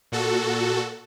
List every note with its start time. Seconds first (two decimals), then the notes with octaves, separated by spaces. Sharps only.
0.12 A#2 F#4 A4